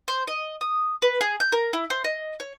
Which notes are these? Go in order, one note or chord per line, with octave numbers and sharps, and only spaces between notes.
C5
D#5
D#6
B4
G#4
G6
A#4
E4
C5
D#5
C#5